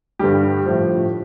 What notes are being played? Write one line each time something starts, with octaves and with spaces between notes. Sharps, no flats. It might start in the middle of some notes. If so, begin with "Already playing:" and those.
G2 D3 G3 G4
A2 F3